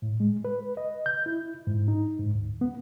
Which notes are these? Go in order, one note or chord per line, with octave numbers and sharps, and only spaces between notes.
A2
G#3
B4
D#5
G6
E4
G#2
D#4
G#2
D2
B3